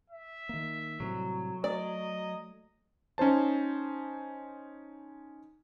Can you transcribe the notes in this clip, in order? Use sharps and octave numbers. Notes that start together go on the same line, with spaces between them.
E5
D#3 A#3
A2 C3 F#3 G3
A3 D5 D#5
C#4 D#4 C5 A5